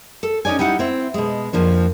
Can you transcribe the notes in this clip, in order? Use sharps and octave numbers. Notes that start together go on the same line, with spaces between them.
A4
C#4 D#4 C#5 D5 G#5
G3 D#4 E4 F#5
C4 E4
B2 G#3
F2 F3 A#3 D4